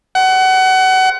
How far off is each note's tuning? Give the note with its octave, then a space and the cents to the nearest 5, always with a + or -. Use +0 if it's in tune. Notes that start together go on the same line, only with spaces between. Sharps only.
F#5 +25